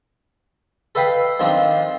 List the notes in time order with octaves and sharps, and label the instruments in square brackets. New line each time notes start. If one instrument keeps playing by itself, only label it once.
[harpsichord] A4 B4 D#5 F5 G5 B5
D#3 F3 C4 D4 F4